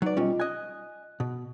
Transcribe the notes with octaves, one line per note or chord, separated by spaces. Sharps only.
F#3 D#4 B4 D5
B2 G3 C#4 F4 D#5
D#5 G#5 F#6
B2